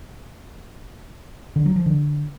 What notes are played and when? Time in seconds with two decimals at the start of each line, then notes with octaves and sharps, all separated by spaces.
1.56 D3
1.66 F#3
1.76 F3
1.86 D3